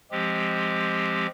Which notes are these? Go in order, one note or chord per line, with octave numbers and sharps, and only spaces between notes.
F3 G#3 C4 G4